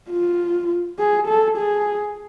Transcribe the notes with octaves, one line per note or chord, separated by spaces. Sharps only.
F4
G#4
A4
G#4